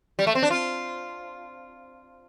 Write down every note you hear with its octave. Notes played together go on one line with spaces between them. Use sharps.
G3
A3
C4
D4
F4